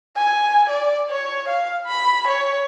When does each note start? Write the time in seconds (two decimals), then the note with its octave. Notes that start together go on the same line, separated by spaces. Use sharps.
0.16 G#5
0.69 D5
1.10 C#5
1.49 F5
1.87 B5
2.28 C#5